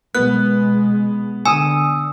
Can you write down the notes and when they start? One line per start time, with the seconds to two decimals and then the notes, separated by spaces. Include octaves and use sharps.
0.15 B2 G#3 B3 F#6
1.46 D3 G#5 D#6 E6